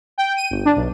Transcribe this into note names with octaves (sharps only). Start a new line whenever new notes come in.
G5
D#7
G1
D4
B1